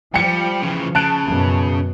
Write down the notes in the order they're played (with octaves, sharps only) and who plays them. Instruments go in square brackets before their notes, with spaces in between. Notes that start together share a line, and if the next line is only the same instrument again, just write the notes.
[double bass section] F3 [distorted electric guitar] G3 [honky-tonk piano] G5 C#7
[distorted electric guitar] C#3 E3
[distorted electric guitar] C#3 [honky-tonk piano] A5 F#6 D7
[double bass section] F#2 B2